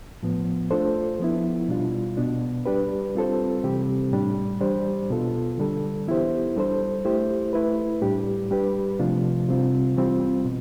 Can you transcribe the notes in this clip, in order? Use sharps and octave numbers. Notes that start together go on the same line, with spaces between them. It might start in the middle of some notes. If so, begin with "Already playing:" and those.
A2 F3 B3
A3 D4 F4 A4 C5
F3 B3 E4
B2 G3 D4 F4
B2 B3 D4
G3 D4 G4 B4
G3 C4 F4 A4 C5
C3 E3 G3 C4 G4
A2 G3 D4
E3 G3 D4 G4 C5
B2 B3 F4 A4
D3 G3 D4 A4
E3 B3 E4 G4 C5
G3 D4 A4 C5
A3 E4 G4 C5
A3 E4 B4
A2 G3 D4 G4
G3 D4 G4 B4
C3 F3 A3 D4 F4
C3 G3 C4 F4
E3 G3 C4 F4
B2